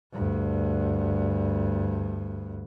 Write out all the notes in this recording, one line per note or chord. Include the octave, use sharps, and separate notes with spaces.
D2 G2